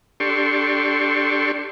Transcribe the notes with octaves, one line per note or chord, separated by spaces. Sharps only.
D4 G4 A4 C6 C#6